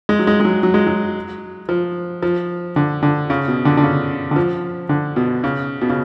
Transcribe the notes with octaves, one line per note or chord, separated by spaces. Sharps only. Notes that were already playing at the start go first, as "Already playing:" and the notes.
G#3
F#3
G#3
G#3
F#3
F#3
G#3
F#3
F3
F3
D3
D3
C#3
B2
D3
D3
C#3
D3
F3
D3
B2
C#3
B2
C#3